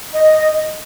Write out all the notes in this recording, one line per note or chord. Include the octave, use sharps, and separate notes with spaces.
D#5